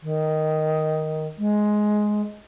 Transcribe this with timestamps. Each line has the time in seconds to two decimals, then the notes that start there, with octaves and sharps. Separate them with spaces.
0.01 D#3
1.38 G#3